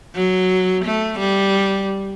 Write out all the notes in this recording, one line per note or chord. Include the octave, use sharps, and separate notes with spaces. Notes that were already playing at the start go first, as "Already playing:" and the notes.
F#3
A3
G3